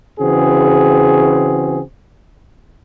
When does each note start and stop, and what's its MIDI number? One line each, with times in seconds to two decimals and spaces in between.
0.20 1.81 49
0.20 1.81 52
0.20 1.81 60
0.20 1.81 66
0.20 1.81 68